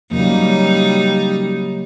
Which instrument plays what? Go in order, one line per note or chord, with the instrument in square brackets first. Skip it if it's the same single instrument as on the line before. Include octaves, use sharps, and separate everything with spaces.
[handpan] C#3 F#3 A#3 [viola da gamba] G3 D#4